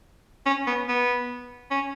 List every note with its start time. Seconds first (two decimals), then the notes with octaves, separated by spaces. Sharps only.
0.46 C#4
0.67 B3
0.89 B3
1.71 C#4